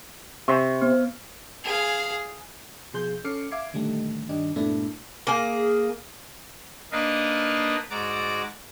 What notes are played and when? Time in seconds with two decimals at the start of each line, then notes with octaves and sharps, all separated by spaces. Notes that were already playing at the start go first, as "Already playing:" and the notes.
0.48 C3 C6 C#6 E6
0.81 B3 C5
1.64 G#4 F5
2.93 B2 F3 G#4 C6 G6
3.24 C#4 A4 D6 F6 C7 C#7
3.51 E5 F5 D6 G#6 C7
3.73 A#2 D3 D#3 G3 A3
4.29 G2 D#3 G3 D4 D#4
4.56 G2 A#2 A3 B3 D4 E4
5.27 A#3 G#4
6.92 A#3 D4 D#4 B4 D#5 F5
7.90 G#2 F#4 D5 A#5 D6